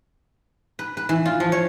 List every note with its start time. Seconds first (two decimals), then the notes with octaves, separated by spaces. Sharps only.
0.79 B4
0.97 B4
1.09 E3
1.26 F4
1.40 F3
1.52 C#5